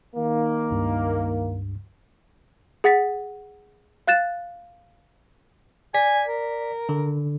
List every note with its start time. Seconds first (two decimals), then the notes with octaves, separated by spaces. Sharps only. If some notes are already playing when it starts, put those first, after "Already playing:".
0.16 D#3 A#3
0.70 C#2 G2
2.84 G#4 F#5 A6 B6
4.08 F5 F#6 A6 E7
5.94 D5 G#5 B6
6.28 A#4
6.89 D3